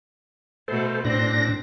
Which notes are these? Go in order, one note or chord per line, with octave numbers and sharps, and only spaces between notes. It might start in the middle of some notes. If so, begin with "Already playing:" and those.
B2 A3 A4 C5
A2 C4 D4 A#6